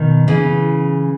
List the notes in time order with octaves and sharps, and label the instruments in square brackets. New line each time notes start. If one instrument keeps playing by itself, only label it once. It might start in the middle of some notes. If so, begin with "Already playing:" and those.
Already playing: [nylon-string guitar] B2 D#3
C#3 E3